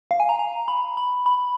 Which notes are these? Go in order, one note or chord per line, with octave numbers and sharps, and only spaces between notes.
F5
G#5
A#5
A#5
B5
B5
B5